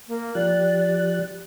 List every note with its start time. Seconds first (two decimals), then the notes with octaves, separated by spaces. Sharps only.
0.08 A#3
0.35 F3 G4 D5 F#6